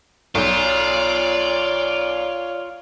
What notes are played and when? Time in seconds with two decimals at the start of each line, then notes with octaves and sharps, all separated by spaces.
0.35 B1 F4 C#5 D5